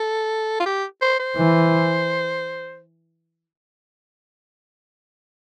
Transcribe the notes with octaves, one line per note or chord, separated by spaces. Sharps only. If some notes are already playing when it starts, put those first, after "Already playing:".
Already playing: A4
F4
G4
C5
C5
E3